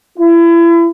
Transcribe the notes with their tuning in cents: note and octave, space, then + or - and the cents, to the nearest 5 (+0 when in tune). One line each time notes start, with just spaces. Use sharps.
E4 +35